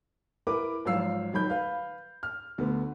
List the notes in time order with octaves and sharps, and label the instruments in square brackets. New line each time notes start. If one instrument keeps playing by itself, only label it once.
[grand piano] E4 A#4 B4 D6
G#1 F3 F#3 F5 E6 C7
D#3 F#3 B5 G6
B4 F5
F6
D2 D3 B3